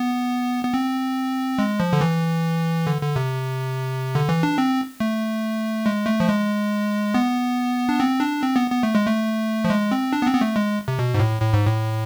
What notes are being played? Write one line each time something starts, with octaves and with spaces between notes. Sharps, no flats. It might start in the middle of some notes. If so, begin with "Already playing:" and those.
Already playing: B3
B3
C4
G#3
F3
D3
E3
D3
D3
C3
D3
E3
D4
C4
A3
G#3
A3
F3
G#3
B3
D4
C4
D4
C4
B3
B3
A3
G#3
A3
F3
G#3
C4
D4
B3
C4
B3
A3
G#3
C3
B2
G#2
A2
A2
G#2
A2